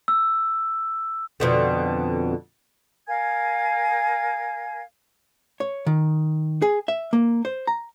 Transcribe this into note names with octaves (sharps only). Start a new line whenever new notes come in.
E6
F2 B2 D3
A#4 F5 G#5 G#6
C#5
D#3
G#4
E5
A#3
C5
A#5